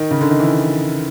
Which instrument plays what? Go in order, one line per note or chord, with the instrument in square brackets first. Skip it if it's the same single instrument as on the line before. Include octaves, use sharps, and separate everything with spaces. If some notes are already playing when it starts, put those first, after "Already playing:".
Already playing: [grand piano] D#3
C#3
D3
D#3
E3